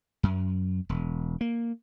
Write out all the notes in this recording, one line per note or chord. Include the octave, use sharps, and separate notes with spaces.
F#2
E1
A#3